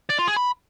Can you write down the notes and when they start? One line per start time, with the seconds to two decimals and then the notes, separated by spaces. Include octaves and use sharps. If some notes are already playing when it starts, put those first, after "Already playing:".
0.10 D5
0.18 F4
0.27 G#4
0.36 B5